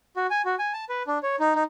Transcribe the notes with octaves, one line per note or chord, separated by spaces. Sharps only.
F#4
G#5
F#4
G#5
A5
B4
D4
C#5
D#4
D#4